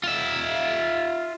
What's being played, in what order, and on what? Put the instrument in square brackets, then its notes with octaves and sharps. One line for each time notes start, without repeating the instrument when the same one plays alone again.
[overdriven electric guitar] F4 E5